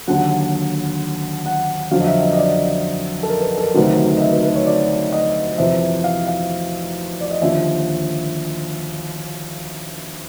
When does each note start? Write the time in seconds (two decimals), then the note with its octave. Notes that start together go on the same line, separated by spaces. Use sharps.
0.08 D#2 D3 F#3 F#5
1.46 F#5
1.91 F2 D3 F#3 F5
2.00 D#5
2.07 E5
2.22 D#5
2.33 D#5
2.37 D5
3.23 A4
3.29 A#4
3.40 B4
3.58 A4
3.63 A#4
3.74 D2 C3 D#3 F#3 B4
4.17 D#5
4.21 E5
4.32 B4
4.44 B4
4.56 C#5
4.66 D5
5.13 D#5
5.58 F2 C3 E3 E5
6.04 F5
6.27 F5
7.21 D5
7.31 D#5
7.42 D#2 D3 F3 E5